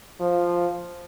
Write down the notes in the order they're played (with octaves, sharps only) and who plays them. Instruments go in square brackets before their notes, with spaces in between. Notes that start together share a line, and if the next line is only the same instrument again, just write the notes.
[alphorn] F3